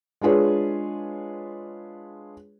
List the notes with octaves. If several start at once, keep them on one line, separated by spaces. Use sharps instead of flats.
G#3 D4 F4 G#4 B4 C#5